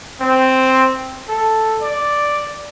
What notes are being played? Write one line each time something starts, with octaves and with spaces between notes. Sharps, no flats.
C4
A4
D5